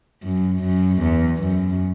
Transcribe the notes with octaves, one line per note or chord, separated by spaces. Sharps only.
F#2
F#2
E2
F#2